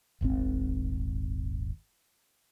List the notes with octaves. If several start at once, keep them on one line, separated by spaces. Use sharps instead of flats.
D#1 G#1 G#2 C4